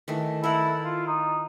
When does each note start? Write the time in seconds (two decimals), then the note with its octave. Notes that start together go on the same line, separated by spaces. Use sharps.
0.08 D#3 E3 A3
0.44 E4 A4 A#4 F#5
0.84 F4
1.07 D#4